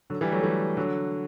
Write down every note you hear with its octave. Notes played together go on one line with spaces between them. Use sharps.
D3 F#3
E3 G3
F#3 A3
E3 G3
D3 F#3